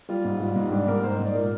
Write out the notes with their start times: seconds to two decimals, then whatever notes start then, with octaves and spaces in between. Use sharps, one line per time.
0.09 G3 F4
0.24 G#2
0.40 G3
0.56 G#2
0.72 G3 D4
0.88 G#2 A#4
1.03 G#2 C5
1.15 D#5
1.20 G#2
1.25 D5
1.35 A#2 A#4